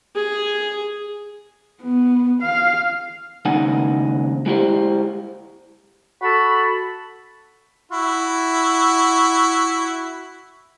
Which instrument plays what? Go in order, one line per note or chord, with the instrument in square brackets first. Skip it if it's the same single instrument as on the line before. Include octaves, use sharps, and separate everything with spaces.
[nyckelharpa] G#4
[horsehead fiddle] B3
F5
[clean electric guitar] D#2 C#3 G#3 D#4 F#5 G#5
G#3 E4 G4 C5
[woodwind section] F#4 A4 A5 B5
[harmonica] E4 F#4